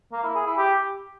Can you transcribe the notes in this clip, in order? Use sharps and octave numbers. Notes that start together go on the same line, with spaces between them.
A#3
E4
G#4
E4
G4